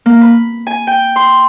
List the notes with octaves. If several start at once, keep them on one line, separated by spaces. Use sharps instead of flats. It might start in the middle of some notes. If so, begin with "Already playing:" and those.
A#3
B5
G#5
G5
C6